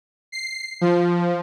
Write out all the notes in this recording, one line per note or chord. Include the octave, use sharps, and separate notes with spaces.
C7
F3